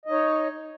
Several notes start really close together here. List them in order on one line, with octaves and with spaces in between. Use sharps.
D#5 D#4 C#5